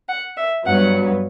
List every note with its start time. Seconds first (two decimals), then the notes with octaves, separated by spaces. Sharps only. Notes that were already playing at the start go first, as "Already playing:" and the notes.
0.08 F#5
0.37 E5
0.65 G2 F#3 B3 F#5